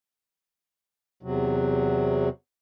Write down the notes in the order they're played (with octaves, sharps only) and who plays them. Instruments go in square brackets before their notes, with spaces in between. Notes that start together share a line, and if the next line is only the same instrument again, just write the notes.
[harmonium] E2 C3 F#3